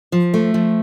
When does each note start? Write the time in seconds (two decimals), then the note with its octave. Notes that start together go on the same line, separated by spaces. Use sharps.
0.12 F3
0.34 A3
0.54 F3